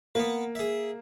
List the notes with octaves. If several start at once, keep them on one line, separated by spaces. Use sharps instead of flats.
A#3 B3 B4
G#4 E5